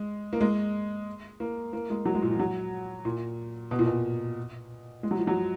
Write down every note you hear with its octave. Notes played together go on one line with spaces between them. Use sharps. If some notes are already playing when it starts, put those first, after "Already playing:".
Already playing: G#3
A#3
G#3
A#3
A#3
G#3
F#3
G#3
A#2
F3
F#3
A#2
B2
A#2
B2
G#3
F#3
F3
F#3